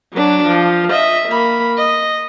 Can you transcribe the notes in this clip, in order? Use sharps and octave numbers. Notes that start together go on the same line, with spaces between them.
F#3 D4
F3
D#5 E5
A#3 B5
D#5